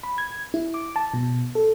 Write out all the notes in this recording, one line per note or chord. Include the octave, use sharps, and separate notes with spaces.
B5
G#6
E4
D6
A5
B2
A4